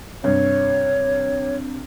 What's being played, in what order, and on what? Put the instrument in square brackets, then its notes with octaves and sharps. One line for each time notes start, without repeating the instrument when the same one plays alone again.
[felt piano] G2 C3 [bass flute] C#5